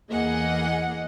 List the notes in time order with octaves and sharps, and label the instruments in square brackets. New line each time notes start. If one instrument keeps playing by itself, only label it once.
[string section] E2 E3 A#3 G#4 D#5 F#5